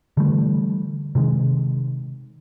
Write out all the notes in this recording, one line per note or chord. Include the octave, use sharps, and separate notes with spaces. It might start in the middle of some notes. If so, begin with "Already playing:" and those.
D3 E3 G3 A3
C3 D#3 G#3